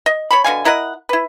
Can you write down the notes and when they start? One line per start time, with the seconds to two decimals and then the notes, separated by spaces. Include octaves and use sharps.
0.06 D#5
0.31 C#5 A5 B5
0.44 B2 D3 F5 G#5
0.65 E4 A#4 D#5 F#5
1.09 E4 B4